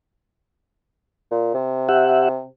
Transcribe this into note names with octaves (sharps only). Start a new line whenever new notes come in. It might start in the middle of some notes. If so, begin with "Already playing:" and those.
A#2
C3
G4 E5 F#5